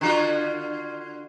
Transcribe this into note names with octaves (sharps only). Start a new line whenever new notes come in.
D3 F4 F#4